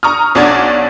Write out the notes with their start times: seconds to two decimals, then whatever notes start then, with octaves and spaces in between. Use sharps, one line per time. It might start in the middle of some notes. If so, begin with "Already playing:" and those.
0.03 A#5 C#6 D#6 F6
0.35 B1 C#4 D4 D5 F#5 G#6